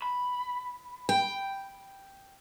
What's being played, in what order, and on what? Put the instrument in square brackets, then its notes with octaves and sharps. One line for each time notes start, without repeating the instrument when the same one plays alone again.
[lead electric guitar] B5
[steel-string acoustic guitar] G5